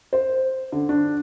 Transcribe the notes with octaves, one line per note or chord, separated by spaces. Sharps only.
C5
D3
D4